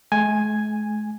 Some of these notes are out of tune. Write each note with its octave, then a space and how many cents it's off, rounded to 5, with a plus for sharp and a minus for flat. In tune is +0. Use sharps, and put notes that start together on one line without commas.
G#3 +45 G#5 +0